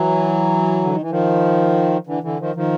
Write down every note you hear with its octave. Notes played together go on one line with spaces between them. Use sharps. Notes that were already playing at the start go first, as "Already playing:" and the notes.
Already playing: E3 F#3
D3
D#3
E3
D#3 F3
D3 E3
D3 E3
D#3 F3
D#3 F3